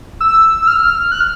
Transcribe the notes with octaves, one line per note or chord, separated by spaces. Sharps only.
E6
E6
F6
F#6
F6